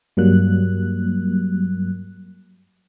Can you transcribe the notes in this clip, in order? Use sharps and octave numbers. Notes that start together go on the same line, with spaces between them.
G2 F#3 G3 A#3 F#6